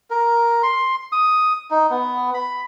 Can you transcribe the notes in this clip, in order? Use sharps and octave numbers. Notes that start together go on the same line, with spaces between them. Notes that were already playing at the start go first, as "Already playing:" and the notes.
A#4
C6
D#6
D#4
B3
B5